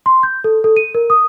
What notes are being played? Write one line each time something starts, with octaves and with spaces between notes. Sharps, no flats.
C6
G6
A4
A4
D#7
A#4
D#6